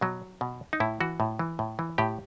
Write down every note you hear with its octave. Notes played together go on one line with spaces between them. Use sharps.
B2 F#3
B2
D#4
A2 E4
E3 F#4
A2
E3
A2
E3
A2 G4